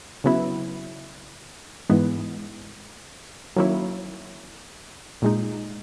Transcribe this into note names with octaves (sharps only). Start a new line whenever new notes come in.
C#3 F#3 B3 E4
G#2 E3 G#3 B3
D#3 F#3 A#3 C#4 E4
A#2 G#3 D#4